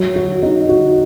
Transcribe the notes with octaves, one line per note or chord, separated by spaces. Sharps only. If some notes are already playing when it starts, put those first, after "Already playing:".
Already playing: F#3
F#4
D#4
F#4